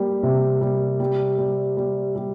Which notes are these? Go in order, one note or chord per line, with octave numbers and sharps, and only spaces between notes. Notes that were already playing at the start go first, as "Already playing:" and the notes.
Already playing: G3 A#3
C3
G3
G3
G3
G3
G3